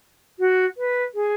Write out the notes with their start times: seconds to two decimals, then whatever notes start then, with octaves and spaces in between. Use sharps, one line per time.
0.39 F#4
0.77 B4
1.14 G#4